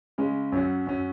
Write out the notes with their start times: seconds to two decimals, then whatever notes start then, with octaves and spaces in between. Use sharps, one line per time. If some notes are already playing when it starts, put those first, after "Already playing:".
0.18 C#3 G#3 C#4
0.52 F#2 F#3 C#4 F#4
0.87 F#2 F#3 C#4 F#4